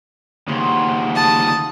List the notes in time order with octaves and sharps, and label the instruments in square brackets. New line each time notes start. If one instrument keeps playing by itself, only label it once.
[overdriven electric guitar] D#2 C#3 [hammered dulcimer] C5 F#5
[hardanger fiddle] A5 D#6